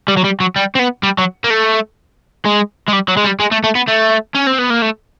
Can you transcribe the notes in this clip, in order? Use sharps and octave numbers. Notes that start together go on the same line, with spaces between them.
G3
F#3
G3
F#3
G3
C4
B3
G3
F#3
A#3
A3
G#3
G#3
G3
F#3
G#3
G3
G#3
A3
A3
B3
A3
C#4
C4
B3
A#3
A3